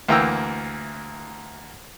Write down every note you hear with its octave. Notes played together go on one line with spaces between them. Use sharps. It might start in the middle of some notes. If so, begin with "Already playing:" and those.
D2 E3 A#3 G5 A#5 E6